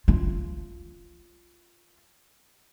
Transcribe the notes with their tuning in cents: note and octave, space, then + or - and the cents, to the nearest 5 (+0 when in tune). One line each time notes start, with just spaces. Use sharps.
F4 -10